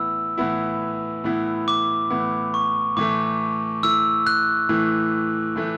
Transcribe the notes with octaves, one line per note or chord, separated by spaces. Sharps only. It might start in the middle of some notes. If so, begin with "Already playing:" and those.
Already playing: A2 E3 B3 E4 E6
A2 E3 B3 E4
A2 E3 B3 E4
D6
A2 E3 B3 E4
C#6
A2 E3 A3 D6
A2 E3 A3 E6
F#6
A2 E3 A3
A2 E3 A3